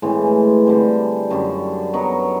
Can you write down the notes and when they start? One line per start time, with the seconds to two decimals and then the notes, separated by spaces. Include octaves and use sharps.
0.02 A2 E3 G#3 C4
0.66 D3 G3 C4
1.30 F#2 D3 G3
1.94 F#3 B3 D#4